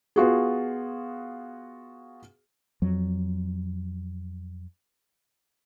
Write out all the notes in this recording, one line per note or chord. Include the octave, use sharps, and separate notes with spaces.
B3 F4 F#4 G#4
F2 F#3